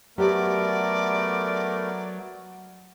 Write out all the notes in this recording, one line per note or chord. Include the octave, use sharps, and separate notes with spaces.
F#3 A3 B3 G4 A#4 D5